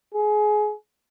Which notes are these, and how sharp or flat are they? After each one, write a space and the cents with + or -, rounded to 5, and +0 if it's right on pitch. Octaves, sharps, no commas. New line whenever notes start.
G#4 +25